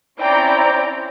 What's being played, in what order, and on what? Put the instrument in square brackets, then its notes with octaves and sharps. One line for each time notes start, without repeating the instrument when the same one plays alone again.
[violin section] C4 C#4 E4 D5 G5 A#5